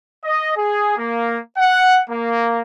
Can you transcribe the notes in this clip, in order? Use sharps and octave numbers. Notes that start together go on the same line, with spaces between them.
D#5
G#4
A#3
F#5
A#3